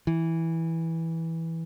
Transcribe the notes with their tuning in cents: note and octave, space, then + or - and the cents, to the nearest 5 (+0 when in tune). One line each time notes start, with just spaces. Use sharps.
E3 -10